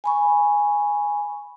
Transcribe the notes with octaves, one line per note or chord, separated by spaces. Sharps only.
G#5 B5 C#6